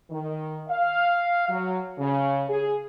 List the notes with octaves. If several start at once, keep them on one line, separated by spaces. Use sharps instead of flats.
D#3
F5
F#3
C#3
G#4